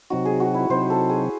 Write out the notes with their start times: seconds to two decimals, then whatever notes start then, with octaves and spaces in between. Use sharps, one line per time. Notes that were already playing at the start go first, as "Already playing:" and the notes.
0.10 C3 F#3 C4 D#4 F#4
0.25 G#4
0.40 F#4
0.54 E4
0.70 C3 F#3 C4 D#4 C5
0.90 A4
1.09 G#4